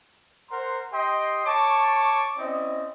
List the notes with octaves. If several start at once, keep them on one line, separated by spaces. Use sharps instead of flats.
A#4 C5 F#5 A#5 C6
G4 D#5 G5 C6
C#5 A5 C#6 D6
C4 C#4 E4 D5 D#5